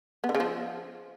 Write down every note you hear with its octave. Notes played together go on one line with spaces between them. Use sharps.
B3
D3
C#3
F3